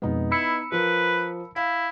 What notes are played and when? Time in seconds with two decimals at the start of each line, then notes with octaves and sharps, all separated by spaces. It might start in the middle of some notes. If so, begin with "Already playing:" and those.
0.02 F2 B2 G#3 B3 D#4
0.32 E4 B5 E6 C#7
0.72 F3 A#4 B4
1.56 E4 F5